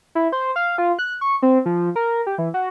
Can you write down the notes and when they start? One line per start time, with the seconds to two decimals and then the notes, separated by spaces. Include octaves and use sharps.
0.15 E4
0.32 C5
0.56 F5
0.78 F4
0.99 F#6
1.21 C#6
1.42 C4
1.66 F3
1.96 A#4
2.27 G4
2.38 E3
2.54 F#4